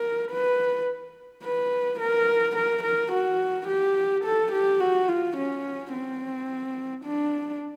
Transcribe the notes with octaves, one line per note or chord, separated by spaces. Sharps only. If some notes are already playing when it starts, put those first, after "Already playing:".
Already playing: A#4
B4
B4
A#4
A#4
A#4
F#4
G4
A4
G4
F#4
F4
C#4
C4
D4